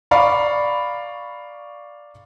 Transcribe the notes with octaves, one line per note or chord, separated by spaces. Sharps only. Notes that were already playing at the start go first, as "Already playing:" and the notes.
D5 F5 A#5 B5 C#6